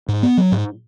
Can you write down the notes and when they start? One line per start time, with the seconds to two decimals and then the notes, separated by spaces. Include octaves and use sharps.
0.08 G#2
0.23 B3
0.37 F#3
0.52 G#2